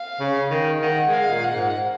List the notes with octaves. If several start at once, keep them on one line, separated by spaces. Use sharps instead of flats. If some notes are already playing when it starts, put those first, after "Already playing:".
Already playing: F5
C#3
D#3
D#3 F#5
G#3
F5
A#2
F#5
G#2